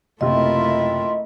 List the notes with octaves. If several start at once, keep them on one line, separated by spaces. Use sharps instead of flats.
F#1 C3 A3 E4 F4 A#4 D#5